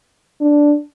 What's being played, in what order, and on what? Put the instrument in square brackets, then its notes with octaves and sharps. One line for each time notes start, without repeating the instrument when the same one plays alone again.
[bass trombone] D4